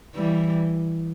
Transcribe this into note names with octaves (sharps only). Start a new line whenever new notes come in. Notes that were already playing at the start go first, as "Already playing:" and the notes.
E3 G3